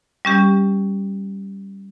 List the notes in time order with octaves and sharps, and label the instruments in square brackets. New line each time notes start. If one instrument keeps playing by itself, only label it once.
[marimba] G3 C#4 G4